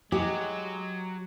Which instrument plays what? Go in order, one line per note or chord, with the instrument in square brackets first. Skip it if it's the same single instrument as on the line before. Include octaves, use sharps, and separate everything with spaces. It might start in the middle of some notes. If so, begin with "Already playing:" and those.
[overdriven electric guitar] F#3 [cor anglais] G#3 [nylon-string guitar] G4